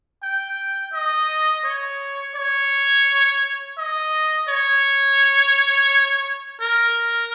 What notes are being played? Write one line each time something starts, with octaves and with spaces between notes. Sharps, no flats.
G5
D#5
C#5
C#5
D#5
C#5
A#4